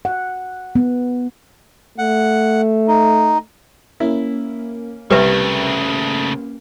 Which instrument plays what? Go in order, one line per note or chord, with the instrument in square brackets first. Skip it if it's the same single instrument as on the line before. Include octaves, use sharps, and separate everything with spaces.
[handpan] F#5
B3
[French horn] A3 [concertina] F#5
[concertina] D#4
[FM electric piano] A#3 C#4 A#4 [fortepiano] E4
[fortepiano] C2 [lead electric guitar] C#3 A3 [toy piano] G4 B4 E5